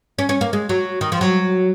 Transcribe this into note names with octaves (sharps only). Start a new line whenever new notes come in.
C#4
C#4
A#3
G#3
F#3
D#3
F3
F#3